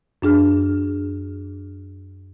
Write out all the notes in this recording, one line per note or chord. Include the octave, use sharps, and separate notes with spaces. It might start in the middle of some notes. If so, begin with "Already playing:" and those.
F#2 D4 G#4 F6